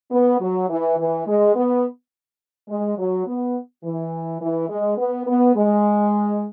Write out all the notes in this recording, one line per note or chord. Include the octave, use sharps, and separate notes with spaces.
B3
F#3
E3
E3
G#3
B3
G#3
F#3
B3
E3
E3
G#3
B3
B3
G#3